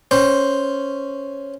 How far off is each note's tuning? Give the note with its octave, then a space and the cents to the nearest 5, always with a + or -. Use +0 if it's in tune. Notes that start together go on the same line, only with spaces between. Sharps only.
C#4 +0 C5 +0